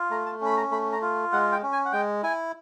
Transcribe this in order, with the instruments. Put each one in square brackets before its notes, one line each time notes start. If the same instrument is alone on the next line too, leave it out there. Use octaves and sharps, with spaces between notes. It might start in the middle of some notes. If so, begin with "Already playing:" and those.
Already playing: [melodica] F4
A3 A#5
A5
C#4 B5
A#5
A3 B5
A#5
F4
G#3 F#5
G5
C#4
G#5
F#5
G#3 G5
E4 G#5